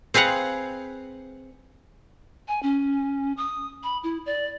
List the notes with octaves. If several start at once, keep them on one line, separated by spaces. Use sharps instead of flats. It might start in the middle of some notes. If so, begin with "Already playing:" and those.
C4 G#4 B4 F5 F#5
G#5
C#4
D#6
B5
E4
D5